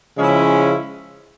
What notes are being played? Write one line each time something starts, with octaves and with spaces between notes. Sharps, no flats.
C#3 F3 G#3 C#4 E4